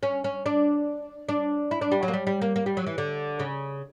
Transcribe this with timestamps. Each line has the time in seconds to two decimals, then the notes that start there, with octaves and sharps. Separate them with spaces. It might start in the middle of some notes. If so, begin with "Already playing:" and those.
0.03 C#4
0.24 C#4
0.46 D4
1.29 D4
1.71 E4
1.81 D4
1.92 G3
2.03 F#3
2.08 A#3
2.13 G3
2.27 G3
2.42 A#3
2.56 A#3
2.66 G3
2.77 F#3
2.87 E3
2.98 D3
3.39 C#3